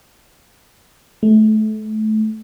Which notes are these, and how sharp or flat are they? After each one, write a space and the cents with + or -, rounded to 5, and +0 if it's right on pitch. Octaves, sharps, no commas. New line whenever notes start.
A3 -25